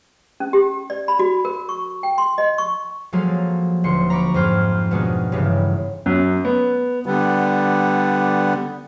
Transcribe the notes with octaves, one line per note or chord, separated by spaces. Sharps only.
C#4
G4
D5
B5
F#4
A#4
C#6
G5
C6
D#5
C#6
F3 F#3 G#3 A#3 A4 A#4
D#1 D3 C6 C#7
A#5 B5 C#6 D6
F2 G#2 C5 F6
B2 D#3 G#3 B3 D4 D#4
G1 G2 C#3 E3
F#2
B3
D3 G3 B3